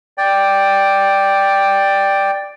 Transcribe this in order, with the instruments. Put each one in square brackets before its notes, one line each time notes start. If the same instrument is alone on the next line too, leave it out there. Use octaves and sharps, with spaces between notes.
[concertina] D5 G5